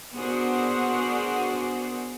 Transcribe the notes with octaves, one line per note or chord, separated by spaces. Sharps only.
B3 D4 F#4 G#4 A#4 C5